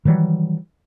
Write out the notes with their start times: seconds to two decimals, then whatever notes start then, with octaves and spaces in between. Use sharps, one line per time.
0.05 D#3 E3 F#3 G3